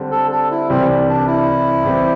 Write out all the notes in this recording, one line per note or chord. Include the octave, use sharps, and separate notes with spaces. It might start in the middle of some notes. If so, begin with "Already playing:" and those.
Already playing: D3 G3 C4
A4
A4
E4
C2 C3 E3 G3 C4
D4
E4
C3 E3 G3 C4 G4